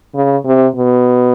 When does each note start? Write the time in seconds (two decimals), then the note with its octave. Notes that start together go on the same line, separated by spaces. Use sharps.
0.15 C#3
0.45 C3
0.76 B2